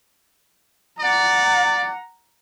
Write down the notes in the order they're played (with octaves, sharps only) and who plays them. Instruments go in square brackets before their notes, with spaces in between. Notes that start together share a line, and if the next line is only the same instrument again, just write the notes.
[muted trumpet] D5 [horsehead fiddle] F#5 A#5